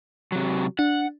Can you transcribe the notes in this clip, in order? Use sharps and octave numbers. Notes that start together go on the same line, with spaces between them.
C3 F#3
D4 F#5